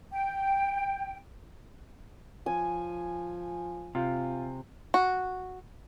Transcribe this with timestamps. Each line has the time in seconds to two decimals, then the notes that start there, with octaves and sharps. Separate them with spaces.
0.12 G5
2.46 F3 G#5
3.95 C3 F4
4.94 F#4